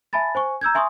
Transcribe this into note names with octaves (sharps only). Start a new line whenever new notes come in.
E5 G#5 A5 B5 A6
C5 G#5 C#6
A#5 E6 G6 G#6
E5 G#5 C6 C#6 D#6